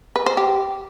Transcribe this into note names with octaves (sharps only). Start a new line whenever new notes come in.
B4
C5
G4